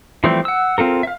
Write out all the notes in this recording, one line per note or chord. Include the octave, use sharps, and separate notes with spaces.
E3 F3 G3 A3 C4
F#5 E6
C4 F4 A4 A#4
E5 F5